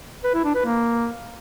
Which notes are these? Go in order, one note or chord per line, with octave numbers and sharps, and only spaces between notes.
B4
E4
D4
B4
A#3